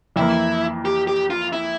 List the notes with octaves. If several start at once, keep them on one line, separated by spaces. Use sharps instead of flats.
F2 E3 A#3 E4
G4
G4
F4
E4